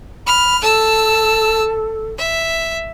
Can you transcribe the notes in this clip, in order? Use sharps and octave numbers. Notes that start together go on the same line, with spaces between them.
B5 F6
A4 A5 E6
E5